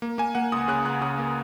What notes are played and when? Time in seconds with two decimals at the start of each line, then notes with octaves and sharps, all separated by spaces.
0.02 A#3
0.18 A#3 G#5
0.35 A#3 F#5
0.52 C#2 D#6
0.68 C#3 F#6
0.85 C#2 F#6
1.01 C#3 D#6
1.18 A#3